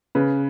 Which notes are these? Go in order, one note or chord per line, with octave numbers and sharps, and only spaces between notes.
C#3 B4